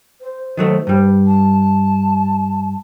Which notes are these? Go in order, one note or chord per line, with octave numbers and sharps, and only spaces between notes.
C5
D#3 F#3 A3
G2 G3
A5